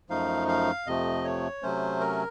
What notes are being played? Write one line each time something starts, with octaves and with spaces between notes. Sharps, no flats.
F#2 F3 A3 D#4 F5
F5
F2 C3 F3 A3 D#5
C#5
C3 F#3 A3 C#4 C5
A#4